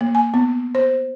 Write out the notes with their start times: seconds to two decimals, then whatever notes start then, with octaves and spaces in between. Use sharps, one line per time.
0.01 A#3
0.15 G#5
0.34 B3
0.75 C5